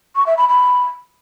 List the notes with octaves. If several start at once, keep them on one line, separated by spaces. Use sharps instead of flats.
C#6
E5
B5
B5